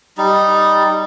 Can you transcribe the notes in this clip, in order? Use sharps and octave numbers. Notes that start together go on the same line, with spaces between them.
G3 D#4